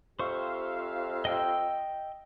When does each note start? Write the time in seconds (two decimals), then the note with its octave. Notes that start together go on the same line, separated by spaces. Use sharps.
0.19 F2 G4 C5 E5 F5 C#6
1.25 D#5 G5 E6